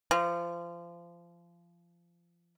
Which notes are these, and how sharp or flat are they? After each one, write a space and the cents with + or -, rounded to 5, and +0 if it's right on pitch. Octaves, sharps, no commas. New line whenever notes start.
F3 -25